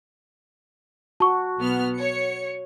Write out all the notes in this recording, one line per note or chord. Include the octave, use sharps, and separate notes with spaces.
F#4 A5 C#6
B1 B3 F6
C#5 C#7